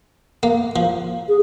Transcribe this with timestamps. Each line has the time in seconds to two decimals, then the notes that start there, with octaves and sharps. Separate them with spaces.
0.43 A#3
0.76 F3
1.28 G#4